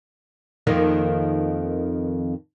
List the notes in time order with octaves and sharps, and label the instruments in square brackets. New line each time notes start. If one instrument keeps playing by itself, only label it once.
[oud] F2 D#3 A#3